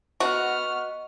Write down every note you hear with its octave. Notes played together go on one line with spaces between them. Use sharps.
B3 F#4 D#5 C#6 F6